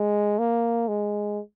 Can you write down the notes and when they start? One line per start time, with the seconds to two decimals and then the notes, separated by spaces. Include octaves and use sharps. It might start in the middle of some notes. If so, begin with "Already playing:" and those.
Already playing: G#3
0.38 A#3
0.88 G#3